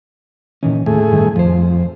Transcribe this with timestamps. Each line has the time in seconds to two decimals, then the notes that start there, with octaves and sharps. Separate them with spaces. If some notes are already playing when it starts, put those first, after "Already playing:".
0.63 A#2 D#3 E3 C#4
0.86 D#2 A2 A3 G#4
1.11 G2 D#3
1.36 F2 F3 C5